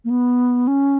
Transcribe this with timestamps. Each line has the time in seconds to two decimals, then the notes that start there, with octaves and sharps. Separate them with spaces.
0.05 A#3
0.10 B3
0.67 C#4